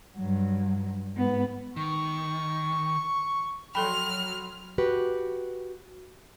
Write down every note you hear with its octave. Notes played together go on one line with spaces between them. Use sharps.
G2 F#3
G#2 B3
D#3 C#6
F3 F#3 A4 G5 B5 C6 F6
F#4 G4 B4